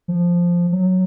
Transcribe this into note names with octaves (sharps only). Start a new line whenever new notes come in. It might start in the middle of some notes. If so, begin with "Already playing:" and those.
F3
F#3